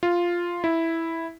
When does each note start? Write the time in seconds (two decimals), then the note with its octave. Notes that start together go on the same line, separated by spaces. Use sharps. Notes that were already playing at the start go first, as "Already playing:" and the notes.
0.03 F4
0.64 E4